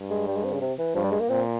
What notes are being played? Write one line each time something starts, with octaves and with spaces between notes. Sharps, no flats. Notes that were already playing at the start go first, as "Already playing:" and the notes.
Already playing: G2
G#3
G3
G#3
C4
C#3
C3
E3
G2 F3
G3
G#3
A#3
A#2 C4